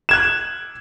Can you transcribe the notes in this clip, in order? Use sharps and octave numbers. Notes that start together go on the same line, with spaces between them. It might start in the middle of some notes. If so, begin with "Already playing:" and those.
F#6 G#6 E7